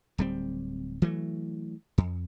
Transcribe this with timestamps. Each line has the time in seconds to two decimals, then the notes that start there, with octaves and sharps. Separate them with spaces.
0.18 D1 G3 C4
1.02 E3 F#3 A3
1.98 F2